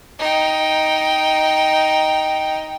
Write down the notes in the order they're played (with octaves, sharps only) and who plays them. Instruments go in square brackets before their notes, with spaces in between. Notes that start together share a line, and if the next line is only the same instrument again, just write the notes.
[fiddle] D#4 G5